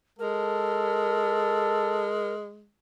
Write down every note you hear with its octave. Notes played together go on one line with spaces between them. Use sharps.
G#3 A4 A#4